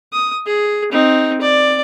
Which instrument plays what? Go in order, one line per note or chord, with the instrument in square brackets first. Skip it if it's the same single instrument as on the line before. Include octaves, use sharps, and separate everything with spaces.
[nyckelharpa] D#6
G#4
C4 D#4
D5